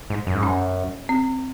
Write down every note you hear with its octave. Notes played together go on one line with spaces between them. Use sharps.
G#2
F#2
G#2
F#2 C#4
C4